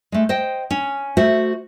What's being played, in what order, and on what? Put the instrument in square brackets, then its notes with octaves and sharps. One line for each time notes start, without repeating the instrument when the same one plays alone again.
[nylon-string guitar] G#3 A3
C5 D#5 G5
C#4
A3 F#4 C5 E5